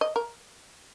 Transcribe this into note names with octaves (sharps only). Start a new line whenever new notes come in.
D#5
A#4